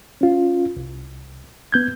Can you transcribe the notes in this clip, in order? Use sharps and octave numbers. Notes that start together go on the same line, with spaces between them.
C#4 F4
C2
B3 G6 G#6